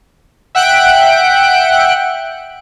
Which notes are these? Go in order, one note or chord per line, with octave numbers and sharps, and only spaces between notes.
E5 F#5 G5 F#6 D7